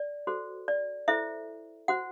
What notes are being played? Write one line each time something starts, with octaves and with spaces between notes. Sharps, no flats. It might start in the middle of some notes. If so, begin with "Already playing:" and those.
Already playing: D5
F#4 A4 C5
D5
E4 A4 C5 E5
F#4 C5 F#5